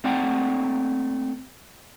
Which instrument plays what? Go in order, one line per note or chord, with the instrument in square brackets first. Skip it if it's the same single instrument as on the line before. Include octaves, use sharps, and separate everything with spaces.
[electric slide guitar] A3 A#3 C4 D5 F#5 G5